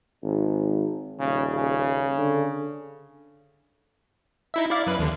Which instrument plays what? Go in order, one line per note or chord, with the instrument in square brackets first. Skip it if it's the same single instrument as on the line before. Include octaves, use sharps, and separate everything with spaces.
[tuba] G#1
[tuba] D#1 [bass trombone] C#3
[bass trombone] C#3
[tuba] D3
[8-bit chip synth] D#4 E4 E5
E4 D5 F5
F#2 B4
D#2 D3